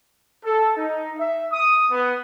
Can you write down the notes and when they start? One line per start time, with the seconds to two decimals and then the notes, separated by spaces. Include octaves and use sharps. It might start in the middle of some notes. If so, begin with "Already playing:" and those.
0.45 A4
0.77 D#4
1.18 E5
1.52 D#6
1.91 B3